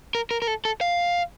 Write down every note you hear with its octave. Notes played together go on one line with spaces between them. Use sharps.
A#4
A#4
A#4
A4
A4
F5